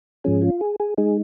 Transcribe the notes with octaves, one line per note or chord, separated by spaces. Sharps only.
G#2 F3 C#4 G#4
F4
G#4
G#4
G#3 D#4 G#4